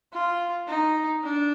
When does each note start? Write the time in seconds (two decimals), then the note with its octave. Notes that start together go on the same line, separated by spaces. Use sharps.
0.13 F4
0.68 D#4
1.23 D4